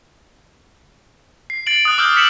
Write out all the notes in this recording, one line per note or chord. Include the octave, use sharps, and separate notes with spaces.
C7
A6 C7 D7 F#7
D#6 F#6
D6 E6 F6 G6
B6 C#7 E7 F#7